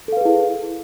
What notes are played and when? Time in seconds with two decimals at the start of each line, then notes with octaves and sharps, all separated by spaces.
0.08 A4
0.12 F5
0.17 B4
0.21 G#4
0.25 E4